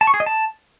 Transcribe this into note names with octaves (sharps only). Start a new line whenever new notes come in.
A5
C#6
G#4
D#5
A5